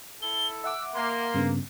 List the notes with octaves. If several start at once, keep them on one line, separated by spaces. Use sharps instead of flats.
E4 A4 G7
E5 F#5 D6 E6
A#3 C6
G2 C#3 B3